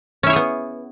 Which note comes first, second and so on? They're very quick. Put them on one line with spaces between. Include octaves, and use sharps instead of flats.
C#4 E4 C#5 G#4 B3